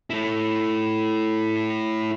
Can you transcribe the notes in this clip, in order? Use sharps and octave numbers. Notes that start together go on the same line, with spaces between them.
A3 E4